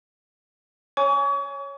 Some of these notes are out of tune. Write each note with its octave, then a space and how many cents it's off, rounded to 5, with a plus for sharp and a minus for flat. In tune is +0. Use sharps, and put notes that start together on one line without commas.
C#5 +0 G#5 +0 C#6 +40